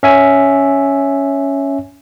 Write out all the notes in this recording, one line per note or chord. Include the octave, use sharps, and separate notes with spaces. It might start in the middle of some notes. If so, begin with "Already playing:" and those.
C#4 E5 G#5